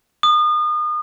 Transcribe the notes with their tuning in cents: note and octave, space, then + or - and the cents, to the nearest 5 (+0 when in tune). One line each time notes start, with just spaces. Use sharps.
D#6 -35